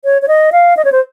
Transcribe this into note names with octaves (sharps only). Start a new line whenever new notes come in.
C#5
C#5
D#5
F5
D#5
C#5
C5